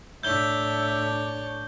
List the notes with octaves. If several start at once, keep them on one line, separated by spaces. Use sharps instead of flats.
A2 D4 C#5 D5 E5 G6 G7